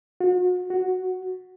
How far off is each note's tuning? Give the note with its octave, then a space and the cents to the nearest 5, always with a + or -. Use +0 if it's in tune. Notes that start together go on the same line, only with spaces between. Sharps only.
F#4 -40
F#4 +0